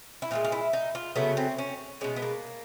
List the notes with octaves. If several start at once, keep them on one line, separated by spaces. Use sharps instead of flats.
E4
A#2 F3 G#3 F4
F4
E4
D#4
F4
C#3 F#3 A3 B3
C4
C#4
B2 G#3 C#4
B3
A#3